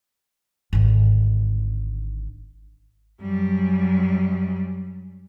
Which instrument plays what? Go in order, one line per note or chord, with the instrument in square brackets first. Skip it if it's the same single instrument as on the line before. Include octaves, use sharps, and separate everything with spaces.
[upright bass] G#1 D3
[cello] F#2 G3